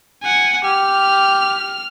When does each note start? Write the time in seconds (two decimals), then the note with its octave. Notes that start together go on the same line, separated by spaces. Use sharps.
0.23 F#5 G#5
0.64 G4 F6